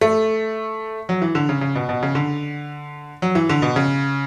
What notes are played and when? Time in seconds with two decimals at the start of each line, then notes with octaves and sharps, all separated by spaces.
0.01 A3
1.09 F#3
1.22 E3
1.35 D3
1.49 C#3
1.61 C#3
1.75 B2
1.89 B2
2.03 C#3
2.15 D3
3.22 F#3
3.35 E3
3.50 D3
3.62 B2
3.76 C#3